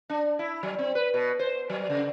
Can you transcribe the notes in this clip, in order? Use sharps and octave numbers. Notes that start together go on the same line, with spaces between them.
D4
E4
F#3
C4
B4
B2
C5
F#3
C#3